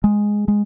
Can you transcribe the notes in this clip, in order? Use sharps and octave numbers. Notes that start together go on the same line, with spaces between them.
G#3
G#3